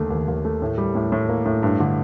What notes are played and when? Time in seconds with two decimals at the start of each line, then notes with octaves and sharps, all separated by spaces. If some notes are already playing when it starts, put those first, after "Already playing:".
Already playing: D#2 D3 A3
0.11 D#2
0.28 D#2
0.45 A3
0.62 A2
0.78 G3
0.95 A2
1.12 A2
1.29 A#3
1.46 A2
1.63 G2
1.80 D3